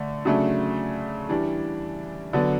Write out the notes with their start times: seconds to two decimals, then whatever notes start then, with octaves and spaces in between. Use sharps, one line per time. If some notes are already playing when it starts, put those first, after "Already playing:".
Already playing: D3 A3
0.25 C#3 F#3 A3 D4
1.29 E3 G3 D4
2.33 D3 F#3 B3 D4